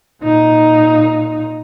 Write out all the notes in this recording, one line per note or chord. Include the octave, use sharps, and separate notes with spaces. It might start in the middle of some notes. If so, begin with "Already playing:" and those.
A#2 D#4